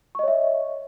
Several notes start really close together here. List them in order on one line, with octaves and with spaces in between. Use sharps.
C#6 D#5 C#5 E5